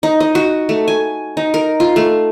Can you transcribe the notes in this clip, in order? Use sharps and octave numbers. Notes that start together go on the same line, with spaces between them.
D#4
D#5
F#4
A3
G#5
D#4
A#4
F4
A3